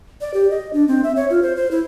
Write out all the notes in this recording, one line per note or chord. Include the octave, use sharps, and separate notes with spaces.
D5
G4
D#5
D4
C4
E5
C#5
F4
C5
C5
E4